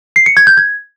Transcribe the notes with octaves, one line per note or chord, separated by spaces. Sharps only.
C7
C#7
G#6
G6
G#6